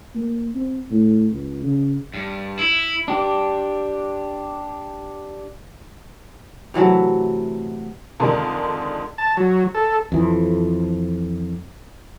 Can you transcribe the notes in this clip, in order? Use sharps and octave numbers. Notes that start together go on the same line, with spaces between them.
A#3
C4
A2
C#2
C#3
G2
E4
D4 G4
C3 E3 F#3 A3
F2 D3 D#3 G#3 D4 A#4
A5
F#3
A4
F2 E3